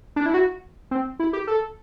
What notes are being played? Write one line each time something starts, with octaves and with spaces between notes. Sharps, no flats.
D4
E4
F#4
C4
E4
G4
A4